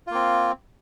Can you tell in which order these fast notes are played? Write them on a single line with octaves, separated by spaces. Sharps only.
F4 A#3 C4